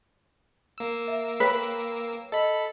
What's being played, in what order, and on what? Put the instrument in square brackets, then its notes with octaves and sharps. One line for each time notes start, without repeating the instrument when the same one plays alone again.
[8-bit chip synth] A#3 E6
[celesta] E5
[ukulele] B4 [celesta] C#5 G5
[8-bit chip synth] A4 B5 [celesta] D#5